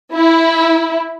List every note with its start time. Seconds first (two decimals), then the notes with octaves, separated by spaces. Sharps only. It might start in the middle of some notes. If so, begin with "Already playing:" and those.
0.13 E4